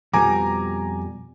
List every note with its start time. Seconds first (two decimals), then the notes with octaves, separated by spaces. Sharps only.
0.13 F2 B2 G3 G#5 A#5 D6